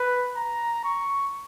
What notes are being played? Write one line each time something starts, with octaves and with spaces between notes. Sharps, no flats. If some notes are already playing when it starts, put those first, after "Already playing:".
Already playing: B4
A#5
C#6